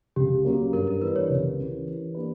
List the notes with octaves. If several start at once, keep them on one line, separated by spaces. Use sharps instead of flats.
C#2 G4
C#3 F#3 A#3
G2 A#4
A#4
E3 G3 B3 D4 B4
C#5
C#2
C#3 E3
E3
A#3 D4 G4 B4